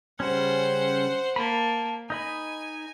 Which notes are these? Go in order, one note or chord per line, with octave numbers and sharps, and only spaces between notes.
C#3 G3 C#4 C5 F#5
A#3 A5 B5
D#4 D#5 G#5 B5